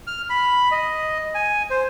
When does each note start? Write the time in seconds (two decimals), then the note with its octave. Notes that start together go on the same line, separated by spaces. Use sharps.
0.07 F6
0.30 B5
0.71 D#5
1.35 G#5
1.70 C5